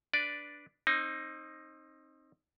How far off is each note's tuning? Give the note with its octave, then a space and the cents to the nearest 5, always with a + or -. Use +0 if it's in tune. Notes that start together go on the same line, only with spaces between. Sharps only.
D4 +0 B4 +0 D5 +0
C4 +30 D#4 +0